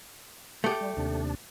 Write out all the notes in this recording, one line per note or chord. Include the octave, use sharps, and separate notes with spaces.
A3 G4 G#4 F#5
G3
D#2 C3 D4